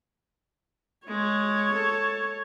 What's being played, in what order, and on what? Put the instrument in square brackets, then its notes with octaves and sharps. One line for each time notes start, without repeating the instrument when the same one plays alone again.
[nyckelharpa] G#3 [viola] C#5
[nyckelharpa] A4